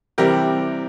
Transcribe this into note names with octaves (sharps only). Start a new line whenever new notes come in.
C3 E3 G3 C4 G4 A#4